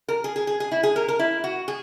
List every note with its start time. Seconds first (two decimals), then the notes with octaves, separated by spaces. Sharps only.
0.08 A#4
0.24 G#4
0.36 G#4
0.47 G#4
0.60 G#4
0.72 E4
0.83 G#4
0.96 A#4
1.08 A#4
1.19 E4
1.44 F#4
1.68 G#4